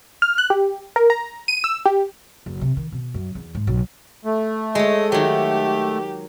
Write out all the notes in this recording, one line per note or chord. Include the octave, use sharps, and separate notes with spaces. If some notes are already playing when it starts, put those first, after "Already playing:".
F6
F#6
G4
A#4
A#5
D#7
E6
G4
F#1
C3
D#3
B2
F#2
E2
G#2
B1
A3
G#3 C#5 D#5
D#3 F#3 G4